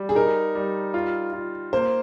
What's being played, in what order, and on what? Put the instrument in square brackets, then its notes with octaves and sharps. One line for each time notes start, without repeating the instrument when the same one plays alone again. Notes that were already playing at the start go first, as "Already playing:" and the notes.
Already playing: [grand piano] G3
[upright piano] G#4
[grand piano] D#4 [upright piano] A#4
[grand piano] G3
F4
F4
[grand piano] A#3 [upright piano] C5